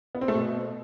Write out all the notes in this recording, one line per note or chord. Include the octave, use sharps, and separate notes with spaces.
B3
C4
A3
B2